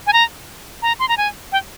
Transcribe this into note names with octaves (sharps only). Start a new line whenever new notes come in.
G#5
A#5
A#5
C6
A#5
G#5
G5